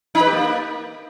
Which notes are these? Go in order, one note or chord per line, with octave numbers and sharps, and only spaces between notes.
D#4
B4
G4
A#3